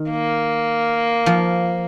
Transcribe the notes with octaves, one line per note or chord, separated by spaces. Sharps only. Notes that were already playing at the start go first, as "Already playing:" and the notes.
Already playing: D#3
A#3
F3